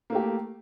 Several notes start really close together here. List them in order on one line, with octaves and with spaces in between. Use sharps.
A#3 A3 G4